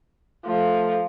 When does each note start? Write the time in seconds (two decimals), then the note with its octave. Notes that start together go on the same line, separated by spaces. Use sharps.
0.46 F3 A3